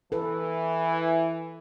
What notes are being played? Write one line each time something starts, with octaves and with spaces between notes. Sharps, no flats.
E3 A4 B4